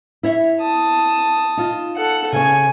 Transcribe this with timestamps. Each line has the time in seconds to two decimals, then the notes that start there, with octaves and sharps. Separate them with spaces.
0.23 E4 C#5 E5
0.61 A5 D#6
1.57 D#4 F4
1.96 A4 F#5
2.32 C#3 C#5 G#5